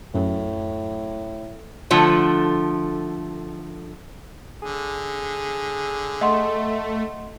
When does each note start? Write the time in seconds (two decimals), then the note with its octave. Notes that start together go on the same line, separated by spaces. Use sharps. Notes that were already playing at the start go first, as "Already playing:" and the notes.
0.14 F#2 A2
1.91 D3 F3 A3
4.62 D3 G#4
6.21 A3 D#5 F#5 C6